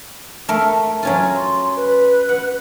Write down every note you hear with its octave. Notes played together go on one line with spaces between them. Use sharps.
A3 A#4 F5
F#3 C#4 F4
C6
B4
F#5